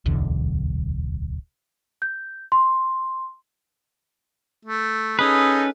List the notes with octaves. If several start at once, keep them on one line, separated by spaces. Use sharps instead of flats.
D1 B1 E2 D3
G6
C6
A3
C#4 D#4 G#4 A4 B4